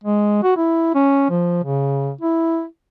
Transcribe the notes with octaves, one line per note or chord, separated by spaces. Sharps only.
G#3
F#4
E4
C#4
F3
C#3
E4